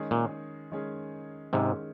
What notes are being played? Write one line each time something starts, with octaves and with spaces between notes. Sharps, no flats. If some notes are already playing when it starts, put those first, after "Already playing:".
Already playing: D#3 G#3 C#4 G#4
A#2
D#3 G#3 C#4 G#4
G#2 C3 D#3 G#3 C#4 G#4